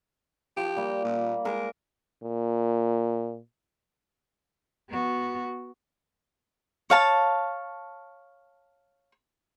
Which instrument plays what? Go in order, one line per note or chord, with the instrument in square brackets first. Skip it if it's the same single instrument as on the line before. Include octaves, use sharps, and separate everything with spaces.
[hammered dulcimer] F3 [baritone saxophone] G4
[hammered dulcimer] G3 A#3
[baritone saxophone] A#2
[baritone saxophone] G#3 [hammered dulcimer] A#4
[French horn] A#2
[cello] B3 F#4
[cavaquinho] C#5 F5 A5